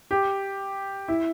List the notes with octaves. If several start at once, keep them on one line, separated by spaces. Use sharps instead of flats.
G4
E4